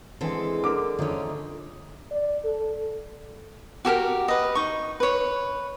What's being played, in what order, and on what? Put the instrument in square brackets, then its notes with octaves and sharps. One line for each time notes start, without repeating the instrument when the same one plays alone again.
[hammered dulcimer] D3 G#3 [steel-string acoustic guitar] E3 C4 A4
[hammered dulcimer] D3 [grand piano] A#4 D6
[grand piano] F2 [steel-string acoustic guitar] D3 C#4 [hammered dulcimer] A3 D#4
[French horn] D5
A4
[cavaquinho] F#4 G4 A4 A#4
B4 D#5
D#4 C#6
B4 C#5